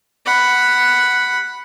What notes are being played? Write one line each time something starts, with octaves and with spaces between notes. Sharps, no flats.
F#5 B5